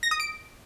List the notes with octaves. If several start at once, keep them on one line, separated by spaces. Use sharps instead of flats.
A#6
D#6
D7